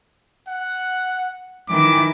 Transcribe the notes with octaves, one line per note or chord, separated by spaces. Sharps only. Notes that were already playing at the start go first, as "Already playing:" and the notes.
F#5
D#3 E3 D6